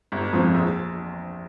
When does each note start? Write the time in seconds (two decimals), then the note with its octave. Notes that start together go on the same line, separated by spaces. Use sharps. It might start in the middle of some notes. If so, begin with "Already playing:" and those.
0.12 G1
0.33 F2 F3 C4
0.54 A#1